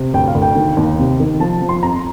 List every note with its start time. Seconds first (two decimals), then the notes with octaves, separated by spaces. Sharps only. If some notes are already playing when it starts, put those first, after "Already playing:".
Already playing: C3
0.14 D2 G5
0.28 F5
0.35 D2
0.42 G5
0.55 D#3
0.77 D#2
0.98 C3
1.20 D#3
1.40 F3 A5
1.62 F3
1.69 C6
1.82 F2 A#5